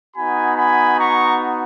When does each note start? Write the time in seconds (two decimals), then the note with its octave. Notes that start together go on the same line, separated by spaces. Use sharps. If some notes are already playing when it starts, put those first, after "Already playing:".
0.16 B3 D#4 F#4 G#5 B5
0.58 G#5 B5
1.00 A#5 C#6